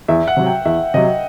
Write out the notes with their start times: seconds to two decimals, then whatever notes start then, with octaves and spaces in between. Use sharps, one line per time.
0.08 E2 E5
0.28 F#5
0.37 C3 F#3
0.46 G5
0.65 E2 E5
0.94 C3 F#3 D#5